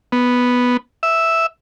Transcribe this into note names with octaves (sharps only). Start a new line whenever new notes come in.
B3
E5